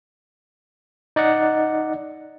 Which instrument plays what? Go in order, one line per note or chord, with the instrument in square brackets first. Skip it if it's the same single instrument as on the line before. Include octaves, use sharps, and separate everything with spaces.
[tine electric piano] D#4 D5 D#5 F#5